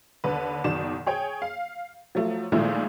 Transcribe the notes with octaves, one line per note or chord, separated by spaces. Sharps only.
D#2 D3 B4
F#1 B2 D#3 D5 E7
G#4 C#5 G5
F5
F3 F#3 A3
A#2 D#3 F3 G#3 A3 E4